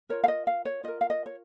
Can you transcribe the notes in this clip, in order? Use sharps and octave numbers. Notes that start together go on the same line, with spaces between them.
F4 A#4 C#5
F5
D#5
F5
C#5
F4 A#4 D#5
F5
D#5
C#5